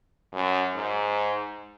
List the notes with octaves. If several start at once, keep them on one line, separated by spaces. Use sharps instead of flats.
F#2
G#2